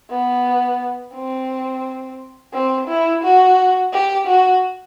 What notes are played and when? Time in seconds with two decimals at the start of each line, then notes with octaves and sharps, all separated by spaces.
0.10 B3
1.14 C4
2.53 C4
2.88 E4
3.24 F#4
3.93 G4
4.28 F#4